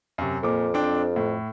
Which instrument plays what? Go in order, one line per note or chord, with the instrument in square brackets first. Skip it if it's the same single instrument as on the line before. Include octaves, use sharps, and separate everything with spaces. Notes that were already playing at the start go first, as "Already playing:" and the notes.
[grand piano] F#2 C3
[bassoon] F2 [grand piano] A#2 D6
[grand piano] C4 D4 G5
A2